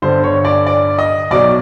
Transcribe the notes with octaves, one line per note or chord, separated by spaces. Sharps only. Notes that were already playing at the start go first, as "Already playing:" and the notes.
G1 G2 D3 C5
C#5
D5
D5
D#5
B1 B2 F#3 D5